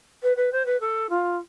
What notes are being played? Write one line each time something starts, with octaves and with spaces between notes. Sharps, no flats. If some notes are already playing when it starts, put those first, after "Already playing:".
B4
B4
C5
B4
A4
F4